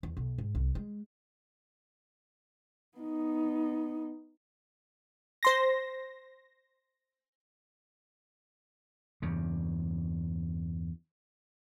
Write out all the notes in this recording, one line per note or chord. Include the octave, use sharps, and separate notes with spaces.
E2
B1
G#2
C2
G#3
B3 D#4
C5 C6 A#6
E2 G2 C#3